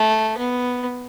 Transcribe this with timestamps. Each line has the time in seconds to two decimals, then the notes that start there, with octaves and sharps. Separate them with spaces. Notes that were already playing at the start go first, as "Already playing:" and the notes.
Already playing: A3
0.38 B3